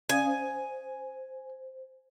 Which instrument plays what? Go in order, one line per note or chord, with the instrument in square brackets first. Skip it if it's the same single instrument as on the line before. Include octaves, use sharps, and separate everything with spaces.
[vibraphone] C#4 F5 D#6 [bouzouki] G#5
[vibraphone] C5